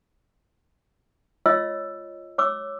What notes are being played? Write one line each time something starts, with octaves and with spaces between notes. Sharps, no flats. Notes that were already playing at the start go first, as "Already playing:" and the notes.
F4 C#5 D#5 E6
C#5 D6 E6